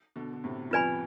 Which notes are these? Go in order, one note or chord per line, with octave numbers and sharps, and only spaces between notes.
B2 D3
D3
A2 C3
F2 F4 B4 D5 G#5 B5